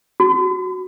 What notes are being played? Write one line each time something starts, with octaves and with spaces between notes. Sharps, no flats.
F#4